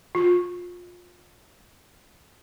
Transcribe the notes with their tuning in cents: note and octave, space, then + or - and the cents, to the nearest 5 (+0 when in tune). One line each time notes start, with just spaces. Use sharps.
F4 +20